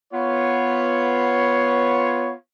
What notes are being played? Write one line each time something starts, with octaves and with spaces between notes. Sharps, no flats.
B3 F4 C#5